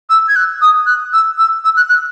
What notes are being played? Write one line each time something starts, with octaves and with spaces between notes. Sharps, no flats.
E6
G#6
F#6
D#6
F#6
E6
E6
E6
F#6
F#6